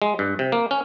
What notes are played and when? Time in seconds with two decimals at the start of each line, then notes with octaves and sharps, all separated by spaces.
0.02 G#3
0.19 G2
0.39 C3
0.52 A#3
0.71 C#4